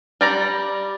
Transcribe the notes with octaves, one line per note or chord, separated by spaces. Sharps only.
G3 D5 A#5